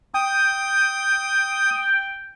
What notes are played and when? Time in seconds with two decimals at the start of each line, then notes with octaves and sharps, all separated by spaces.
0.14 G5 D#6